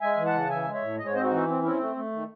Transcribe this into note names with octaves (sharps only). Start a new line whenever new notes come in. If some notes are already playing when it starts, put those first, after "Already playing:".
G#3 E5 G#5
E3
F#5 A5
C#3
E3 E5 G#5
G#3
C#5 E5
A2
G#2 D#5
C#5
C4 C5 D#5
D#4 F#4
E3
C4
C4 C#4 E4
A3
A3
D#3